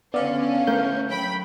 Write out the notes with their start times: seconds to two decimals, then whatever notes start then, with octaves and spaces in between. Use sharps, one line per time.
0.14 D3 B3 C#4 D5 F5
0.67 A3 A#4 F5 G6
1.08 F#3 G5 B5